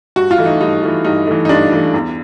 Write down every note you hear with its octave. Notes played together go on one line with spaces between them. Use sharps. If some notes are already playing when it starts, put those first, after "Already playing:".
G2 F#4
F4
E3 A3
D#4
G2 D#4
E3 A3
G2 D#4
E3 A3
D#4
G2 D4
E3 A3
E2